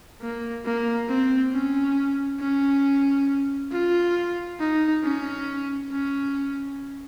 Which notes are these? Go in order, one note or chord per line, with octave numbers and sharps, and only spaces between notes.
A#3
A#3
C4
C#4
C#4
F4
D#4
C#4
C#4